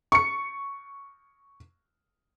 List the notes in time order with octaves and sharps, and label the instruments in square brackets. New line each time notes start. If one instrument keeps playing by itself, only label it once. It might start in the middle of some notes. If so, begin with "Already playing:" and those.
[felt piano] C#6 C#7